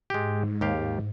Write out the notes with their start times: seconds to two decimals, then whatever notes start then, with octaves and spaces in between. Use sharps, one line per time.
0.10 G#2 G#3 G4
0.61 D#2 G4 F5